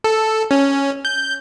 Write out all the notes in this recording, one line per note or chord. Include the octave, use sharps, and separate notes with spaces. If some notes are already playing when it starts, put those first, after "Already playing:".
A4
C#4
G6